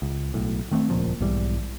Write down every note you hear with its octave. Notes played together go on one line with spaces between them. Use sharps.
C#2
B1 A2
D#3 A3 B3 C4
D#1 C#2 A#2 F3
B1 G#2 E3 G3